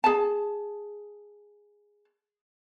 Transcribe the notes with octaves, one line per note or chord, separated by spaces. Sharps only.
G#4 A5